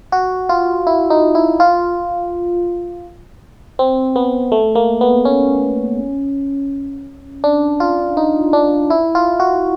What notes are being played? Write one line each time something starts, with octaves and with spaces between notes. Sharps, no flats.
F#4
F4
E4
D#4
E4
F4
C4
B3
A3
A#3
B3
C#4
D4
F4
D#4
D4
E4
F4
F#4